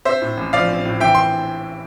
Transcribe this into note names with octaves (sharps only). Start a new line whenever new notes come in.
C4 C5 E5
A2
A1
F3 D5 F5
C4
A2
E3 E5 G5
C6